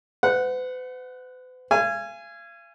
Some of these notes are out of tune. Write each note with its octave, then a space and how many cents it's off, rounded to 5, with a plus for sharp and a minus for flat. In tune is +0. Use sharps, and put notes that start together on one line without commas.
B4 +45 F#5 -10
F5 -40 G#5 -5